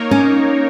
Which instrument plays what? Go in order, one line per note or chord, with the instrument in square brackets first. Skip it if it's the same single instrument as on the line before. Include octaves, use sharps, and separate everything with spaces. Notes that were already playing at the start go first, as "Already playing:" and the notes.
Already playing: [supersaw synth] A#3 D#4 A#4 C#5
[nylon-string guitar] C#4